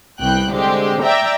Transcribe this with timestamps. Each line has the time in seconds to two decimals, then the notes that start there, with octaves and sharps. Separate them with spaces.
0.20 C2 B3 G5 F#6
0.51 D3 G#3 C4 G4
1.02 D5 E5 G5 A#5